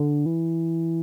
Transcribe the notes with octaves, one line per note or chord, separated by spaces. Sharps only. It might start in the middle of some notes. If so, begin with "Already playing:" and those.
Already playing: D3
E3